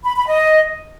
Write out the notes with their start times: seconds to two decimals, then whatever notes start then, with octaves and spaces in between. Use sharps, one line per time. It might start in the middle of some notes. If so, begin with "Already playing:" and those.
0.04 B5
0.15 B5
0.27 D#5